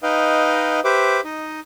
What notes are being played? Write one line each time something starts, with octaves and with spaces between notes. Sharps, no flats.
D#4 B4 D#5 F5 G5
G4 B4 C5 E5 D6
D#4 D#5